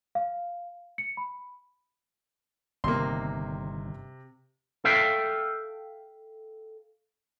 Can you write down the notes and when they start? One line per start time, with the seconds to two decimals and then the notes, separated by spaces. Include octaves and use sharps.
0.15 F5
0.98 C#7
1.17 B5
2.84 G1 C3 D#3 A#3 C6
4.85 A4 E5 F5 G5